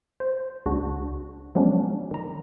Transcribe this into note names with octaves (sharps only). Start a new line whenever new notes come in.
C5
C#2 C#3 D4 F#4
F3 F#3 G#3 B3 C#4 D4
D#3 A#5